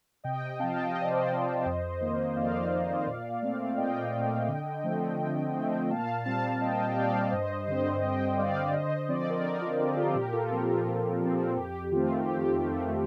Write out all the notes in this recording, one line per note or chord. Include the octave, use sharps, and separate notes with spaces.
C3 D#5 G5
D#5 G5
F3 C4 F5 A5
D#5 G5
C3 D#5
D5
C5 D#5
F3 C4
F2
D#3 A#3
F2 D5 F5
D#3 A#3
A#2
A3 C4
A#2 D#5 G5
A3 C4
D3
F3 A3 C4
D3
F3 A3 C4
A#2 F5 A5
G3 C4 F5 A5
A#2 D#5 G5
G5
G3 C4 D5 F5
G2 C5 D#5
D3 G3 C4 C5 D#5
G2 D#5 G5
D3 G3 C4 D5 F5
D3 C5 D#5
F3 C4 D5
D#5
A#4 D5
D3 A#4 D5
F4
F3 C4 G4
F4 A4
A#2 G4 A#4
F4 A4
F3 C4 G4 A#4
F4
A#2
F3 C4
F2 G4
D#3 A3 C4 F4
F2 G4
D#3 A3 C4